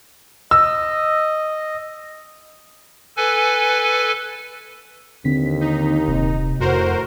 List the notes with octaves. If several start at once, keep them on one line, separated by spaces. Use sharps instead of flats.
D#5 E6
A4 B4 G#5
D#2 D3 C4 B6
D#4
D#1 C3
F2 A2 F#4 A#4 C5